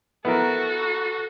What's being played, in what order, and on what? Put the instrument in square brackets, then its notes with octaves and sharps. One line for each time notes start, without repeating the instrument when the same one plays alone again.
[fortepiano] B3 E4 A#4 [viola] F#4 A4